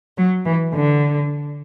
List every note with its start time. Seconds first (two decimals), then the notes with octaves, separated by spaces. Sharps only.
0.18 F#3
0.45 E3
0.74 D3